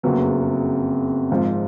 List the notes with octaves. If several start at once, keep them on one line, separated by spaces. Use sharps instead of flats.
F#1 F2 C#3 F#3 B3
G#1 G#2 F3